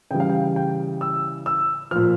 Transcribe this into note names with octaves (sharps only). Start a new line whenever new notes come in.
C#3 E3 G3 G5
F5
G5
G5
E6
E6
A#2 F3 F6